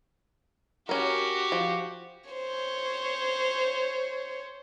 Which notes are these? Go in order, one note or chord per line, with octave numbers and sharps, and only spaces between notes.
C#4 F#4 G4 A#4
F3
C5 C#5